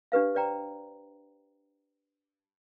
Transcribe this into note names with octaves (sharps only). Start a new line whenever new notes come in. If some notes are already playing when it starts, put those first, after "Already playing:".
D4 G4 B4 F5
B4 C5 D5 G5 A#5